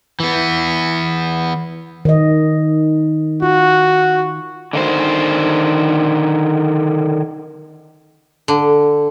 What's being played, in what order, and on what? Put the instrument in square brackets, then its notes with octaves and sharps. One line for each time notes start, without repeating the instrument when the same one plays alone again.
[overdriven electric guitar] E3 B3
[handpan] D#3 D#5
[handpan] F4 [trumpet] F#4
[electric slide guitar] D3 D#3 C5
[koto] D3